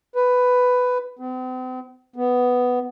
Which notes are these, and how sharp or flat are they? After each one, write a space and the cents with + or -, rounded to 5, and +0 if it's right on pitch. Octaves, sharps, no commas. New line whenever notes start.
B4 +10
C4 -45
B3 +5